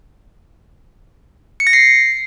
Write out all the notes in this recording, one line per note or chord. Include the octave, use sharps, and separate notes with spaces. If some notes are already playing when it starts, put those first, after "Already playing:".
C#7
A#6
C7